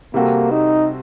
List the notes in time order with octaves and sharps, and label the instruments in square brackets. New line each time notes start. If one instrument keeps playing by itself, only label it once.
[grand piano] C3 G3 C4 F#4 A4 [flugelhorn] A#3
[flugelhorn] D#4